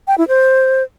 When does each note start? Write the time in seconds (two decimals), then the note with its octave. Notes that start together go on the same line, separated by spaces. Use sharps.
0.08 G5
0.18 E4
0.28 C5